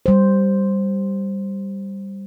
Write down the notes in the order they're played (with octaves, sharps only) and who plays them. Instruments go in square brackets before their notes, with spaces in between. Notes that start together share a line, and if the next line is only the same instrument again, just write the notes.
[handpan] G3 C5